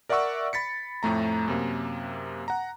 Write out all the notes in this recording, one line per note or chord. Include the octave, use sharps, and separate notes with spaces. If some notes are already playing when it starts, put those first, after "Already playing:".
A#4 D5 E5 F#5 C#6 E6
B5 A6 B6 C#7
F2 A2 A3 A#5
F#2 C3 A#3
F#5 A#5